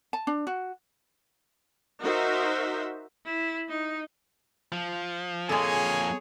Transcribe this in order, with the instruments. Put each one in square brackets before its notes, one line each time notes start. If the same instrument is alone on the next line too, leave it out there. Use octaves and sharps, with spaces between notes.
[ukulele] A5
D4
F#4
[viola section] D#4 F#4 A#4 C5 E5
[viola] E4
D#4
[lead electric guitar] F3
[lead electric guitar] F2 A#3 [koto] G#3 A4 [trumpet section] G#4 C#5 G#5